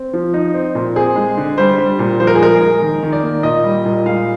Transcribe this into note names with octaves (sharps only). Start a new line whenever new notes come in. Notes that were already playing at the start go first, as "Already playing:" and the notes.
Already playing: C4
F3
D#4
C4
A#2
C4 G#4
G#3
D3
G3 C5
G3
A#2
F3 C5
A#4
G#4
G#3 A#4
G#3
D#3
D#3
D5
A#3
A#2 D#5
G3
A#2
G#3 F5